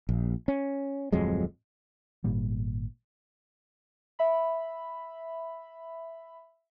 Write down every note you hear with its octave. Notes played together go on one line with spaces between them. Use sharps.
A#1
C#4
D1 F2 F#3 G#3
G#1 A#2 G3
E5 B5